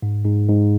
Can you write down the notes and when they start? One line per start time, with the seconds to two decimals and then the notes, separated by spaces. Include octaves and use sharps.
0.02 G#2
0.25 G#2
0.48 G#2